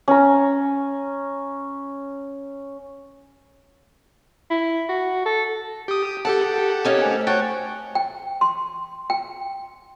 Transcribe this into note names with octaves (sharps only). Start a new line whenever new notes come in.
C#4 A#5
E4
F#4
A4
G4 D#6 D7
G4 A4 F#5 A5
A#3 C#4 D#4
A3 C5 G#5
F#4 C#5 G5 A5 F#6 A6
G5
C6
G5